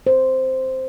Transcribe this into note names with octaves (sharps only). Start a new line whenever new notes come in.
C5